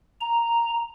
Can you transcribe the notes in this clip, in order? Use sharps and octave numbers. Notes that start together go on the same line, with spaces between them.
A#5